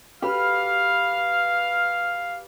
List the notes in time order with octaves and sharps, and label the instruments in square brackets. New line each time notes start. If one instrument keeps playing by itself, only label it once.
[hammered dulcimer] G4 B4 [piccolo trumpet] F5 [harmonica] F6